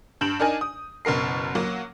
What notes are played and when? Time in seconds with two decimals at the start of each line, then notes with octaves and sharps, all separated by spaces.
0.21 G2 G6 D7 E7 F#7
0.40 D4 D#4 A#4 D5 G#5
0.61 D#6
1.05 F#1 B2 A#4 C7
1.55 F#3 A#3